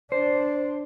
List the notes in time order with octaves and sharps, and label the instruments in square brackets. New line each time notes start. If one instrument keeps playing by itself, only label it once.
[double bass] D4 [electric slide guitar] C5